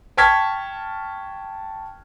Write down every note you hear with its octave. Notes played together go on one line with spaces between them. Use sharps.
G5 A5 C#6 F6 G#6 B6